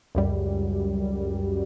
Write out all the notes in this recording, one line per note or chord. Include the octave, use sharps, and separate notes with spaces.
C#2 F#2 G3